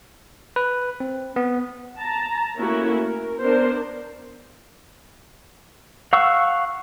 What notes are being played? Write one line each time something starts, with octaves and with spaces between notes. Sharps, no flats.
B4
C4
B3
A5 A#5
A3 A#3 C#4 E4 F#4 A#4
A#4
B3 D4 A#4 C5
F5 F#5 C#6 E6